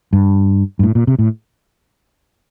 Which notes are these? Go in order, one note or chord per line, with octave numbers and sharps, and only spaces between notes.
G2
G2
A2
A#2
C3
A2